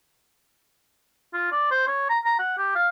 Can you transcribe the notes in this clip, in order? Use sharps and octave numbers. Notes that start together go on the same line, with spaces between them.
F4
D5
C5
C#5
A#5
A#5
F#5
G4
F5